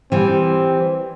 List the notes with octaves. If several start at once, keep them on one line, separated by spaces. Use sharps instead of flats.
E3 G3 C4